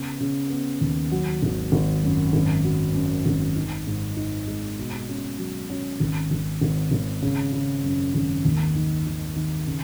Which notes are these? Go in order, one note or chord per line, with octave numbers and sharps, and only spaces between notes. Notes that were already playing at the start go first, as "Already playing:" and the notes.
Already playing: C#3 B3
C#3
B3
D#2
F#3
G#1
G#1
F#2
G#1
F#3
F#2
G#1
D#4
G#2
D#4
G#3
B2
C#4
F#3
C#4
G#1
G#1
G#1
G#1
C#3
C#3
F#2
G#1
D#2
D#3
D#3
D#3
C#3